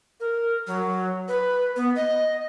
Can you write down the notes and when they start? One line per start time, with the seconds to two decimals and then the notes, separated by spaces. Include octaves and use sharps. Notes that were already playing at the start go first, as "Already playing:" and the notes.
0.20 A#4
0.67 F#3
1.28 B4
1.76 B3
1.96 D#5